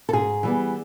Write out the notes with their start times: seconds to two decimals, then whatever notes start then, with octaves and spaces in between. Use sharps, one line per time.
0.09 A4
0.13 G#2 G#4
0.43 E3 G3 B3